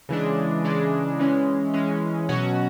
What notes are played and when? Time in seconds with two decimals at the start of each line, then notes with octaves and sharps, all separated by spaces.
0.09 C#3 E3 G#3 D4
0.64 C#3 E3 G#3 D4
1.19 E3 G#3 C#4
1.74 E3 G#3 C#4
2.29 B2 F#3 C#4 F#4